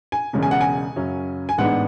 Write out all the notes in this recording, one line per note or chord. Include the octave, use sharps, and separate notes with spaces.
G#5
E1 E2 C#3 G#3 C#4
G#5
F#5
G#5
F#2 C#3 F#3 C#4
G#5
A1 G#2 G#3 B3 D4 F#5